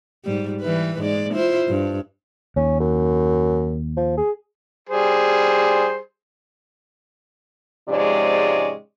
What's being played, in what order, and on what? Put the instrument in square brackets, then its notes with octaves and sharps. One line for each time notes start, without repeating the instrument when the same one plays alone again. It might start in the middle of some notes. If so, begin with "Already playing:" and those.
[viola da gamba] G#2 G3
E3 G3 B4
G#2 G#3 D5
E4 F4 C5
G2
[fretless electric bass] D#2 [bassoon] C#4
[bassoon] F#2
F3
G#4
[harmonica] G3 G#4 C5
[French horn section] G#2 C3 F3 G#3 C#4 D5